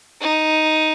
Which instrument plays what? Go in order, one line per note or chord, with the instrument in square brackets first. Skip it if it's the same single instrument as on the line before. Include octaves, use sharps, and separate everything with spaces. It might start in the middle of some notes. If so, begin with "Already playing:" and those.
[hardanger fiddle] D#4